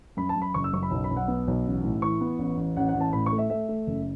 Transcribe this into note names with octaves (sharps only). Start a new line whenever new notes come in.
F#2 B5
A5
F#2
B5
F#1 C#6
E6
F#2 C#6
B5
B1
B5
B1
F#5
B3
B1
A1
A2
E3 C#6
B3
A1
A1
A1 F#5
F#5
A1
A5
A2 B5
C#6
A3
E5
A3 E5
A3
F#1